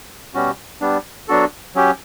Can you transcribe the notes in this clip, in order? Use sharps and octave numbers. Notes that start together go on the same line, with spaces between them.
B2 G3 C#4 F#4
G3 B3 D4
F#3 B3 D4 F#4 A4
F#3 C#4 G4